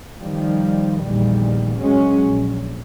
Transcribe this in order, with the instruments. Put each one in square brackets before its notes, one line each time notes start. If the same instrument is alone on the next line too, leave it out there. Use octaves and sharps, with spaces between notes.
[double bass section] D#3 F3 G3
A#1 E2 A#2 D#3 G3
F#3 G#3 C#4
A#1